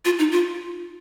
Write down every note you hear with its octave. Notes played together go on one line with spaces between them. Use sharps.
F4
D#4
F4